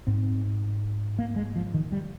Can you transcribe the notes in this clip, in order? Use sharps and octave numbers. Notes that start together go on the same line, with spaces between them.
G#2 C4
A#3
G#3
F3
D#3
G3